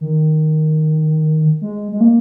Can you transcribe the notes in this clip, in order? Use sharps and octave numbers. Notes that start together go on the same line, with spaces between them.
D#3
G#3
G#3
A#3